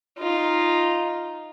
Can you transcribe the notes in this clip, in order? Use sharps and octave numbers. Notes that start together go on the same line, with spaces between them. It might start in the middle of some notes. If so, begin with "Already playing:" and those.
D#4 F4